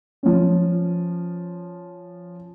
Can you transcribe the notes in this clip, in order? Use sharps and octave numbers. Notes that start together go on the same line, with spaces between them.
F3 C#4